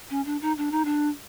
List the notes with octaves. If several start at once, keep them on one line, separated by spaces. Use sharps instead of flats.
C#4
D4
D#4
D4
D#4
D4